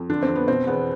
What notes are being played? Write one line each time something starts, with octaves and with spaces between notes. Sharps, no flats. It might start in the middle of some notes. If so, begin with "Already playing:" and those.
Already playing: F2
D3 D4
C4
F2
B3
B2 C4
E2 B3